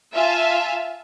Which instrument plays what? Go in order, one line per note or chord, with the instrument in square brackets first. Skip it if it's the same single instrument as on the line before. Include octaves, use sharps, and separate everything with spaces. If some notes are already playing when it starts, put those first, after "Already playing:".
[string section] F4 E5 F5 G#5 A5